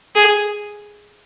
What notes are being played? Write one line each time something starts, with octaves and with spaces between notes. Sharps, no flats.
G#4